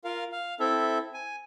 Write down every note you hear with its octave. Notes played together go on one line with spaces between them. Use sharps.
F4 A#4 F5
F5
C4 E4 A4 E5
G#5